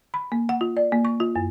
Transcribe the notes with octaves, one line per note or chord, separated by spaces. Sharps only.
B5
A#3
F#5
F4
D5
A#3
C#6
F4
F#2